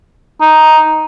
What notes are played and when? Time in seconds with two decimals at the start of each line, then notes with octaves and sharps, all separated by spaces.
0.41 D#4